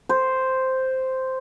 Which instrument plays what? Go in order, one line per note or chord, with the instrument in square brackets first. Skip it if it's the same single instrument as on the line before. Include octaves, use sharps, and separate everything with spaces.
[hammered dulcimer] C5